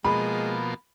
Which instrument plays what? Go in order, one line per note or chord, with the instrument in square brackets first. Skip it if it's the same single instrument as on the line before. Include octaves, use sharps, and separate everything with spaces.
[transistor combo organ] B2 F3 A#3 [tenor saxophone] G#3 [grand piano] B5